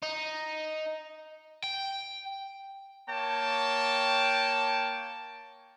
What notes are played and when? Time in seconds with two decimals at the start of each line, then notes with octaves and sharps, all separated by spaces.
0.03 D#4
1.64 G5
3.09 A#3 C#5 G5 A5